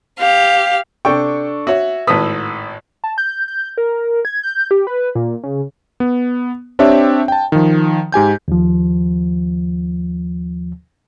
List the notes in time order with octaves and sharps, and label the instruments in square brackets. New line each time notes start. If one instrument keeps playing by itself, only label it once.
[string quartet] G4 F5
[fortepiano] C3 G5 [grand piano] D4 A4 C#6
[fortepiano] F#4 C#5 [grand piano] E5
[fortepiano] G#1 A2 B4 [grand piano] D#6 E6 B6
[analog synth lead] A5
G6
G6
A#4
G#6
G6
G4
B4
A#2
C#3
[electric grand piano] B3
C4 D4 G4 C#5 E5
G5 A5
D#3 F3
G#2 G4 G#5 G6
[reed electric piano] D#2 F3